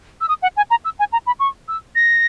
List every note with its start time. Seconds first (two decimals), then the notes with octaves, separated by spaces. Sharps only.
0.21 E6
0.29 D#6
0.43 F#5
0.57 G#5
0.70 A#5
0.85 E6
0.99 G#5
1.13 A#5
1.27 B5
1.40 C#6
1.68 E6
1.95 A#6